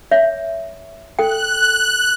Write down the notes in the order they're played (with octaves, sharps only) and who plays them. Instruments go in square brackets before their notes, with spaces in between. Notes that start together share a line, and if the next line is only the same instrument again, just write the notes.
[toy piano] C#5 E5
[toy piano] A4 G5 [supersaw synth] F#6